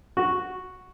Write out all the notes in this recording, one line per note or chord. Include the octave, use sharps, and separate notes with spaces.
F#4